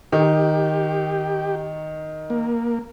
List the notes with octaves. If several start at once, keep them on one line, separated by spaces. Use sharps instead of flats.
D#3 G4
A#3